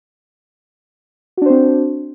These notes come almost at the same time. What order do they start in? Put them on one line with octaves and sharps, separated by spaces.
F#4 D4 C5 C4